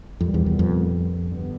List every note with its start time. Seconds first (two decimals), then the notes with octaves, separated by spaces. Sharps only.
0.20 C2 F2 A#2 G3 B3
0.34 E2
0.46 E2
0.59 F2
1.23 G2 D3 G3 B3